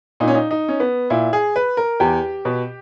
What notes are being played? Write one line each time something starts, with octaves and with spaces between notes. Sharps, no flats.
A#2 D#4
C#4
D#4
D#4
C#4
B3
A#2 E4
G#4
B4
A#4
E2 G4
B2